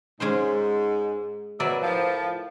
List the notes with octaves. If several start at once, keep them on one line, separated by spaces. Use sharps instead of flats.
G#2 G#3 C#4 C5
B2 F#3 A#4 B4 D5 E5
A2 F3